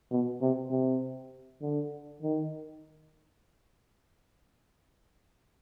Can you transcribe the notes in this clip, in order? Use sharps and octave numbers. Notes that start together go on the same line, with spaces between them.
B2
C3
C3
D3
D#3